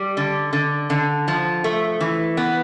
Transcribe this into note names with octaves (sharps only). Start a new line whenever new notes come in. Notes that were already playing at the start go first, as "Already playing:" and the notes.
Already playing: G3
D3
D3
D3
F3
A3
E3
B3